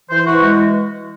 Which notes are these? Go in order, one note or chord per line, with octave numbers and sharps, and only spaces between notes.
E3 C5
E3 F#4
G#3 F#4